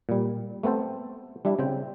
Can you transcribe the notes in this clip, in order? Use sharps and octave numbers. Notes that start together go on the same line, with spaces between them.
A#2 G3
A3 B3 C4 A4 C5
G3 D4 E4 E5
C#3 C4 G5